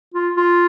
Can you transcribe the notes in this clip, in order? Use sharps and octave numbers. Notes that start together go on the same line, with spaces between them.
F4
F4